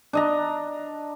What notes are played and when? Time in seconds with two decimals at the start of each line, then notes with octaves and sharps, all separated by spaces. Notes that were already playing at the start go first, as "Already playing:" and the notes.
0.13 D4 D#5 A#5